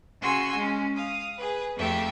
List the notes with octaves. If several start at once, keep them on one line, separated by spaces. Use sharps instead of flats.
C#3 F#4 G#5 C6 C#6 E6
G#3 C#4
F5 D#6
G#4 B4
F2 A3 G4 E5